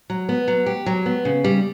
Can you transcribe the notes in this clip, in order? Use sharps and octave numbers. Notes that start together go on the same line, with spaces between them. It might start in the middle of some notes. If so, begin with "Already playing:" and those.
F#3
B3
F#3
G4
F#3
B3
C#3
G3